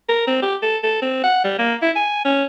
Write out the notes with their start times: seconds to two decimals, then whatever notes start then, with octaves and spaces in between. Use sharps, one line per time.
0.09 A#4
0.27 C4
0.42 G4
0.62 A4
0.83 A4
1.02 C4
1.24 F#5
1.44 G3
1.59 A#3
1.82 E4
1.96 G#5
2.25 C#4